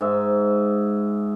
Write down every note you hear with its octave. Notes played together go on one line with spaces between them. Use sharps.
G#2 E5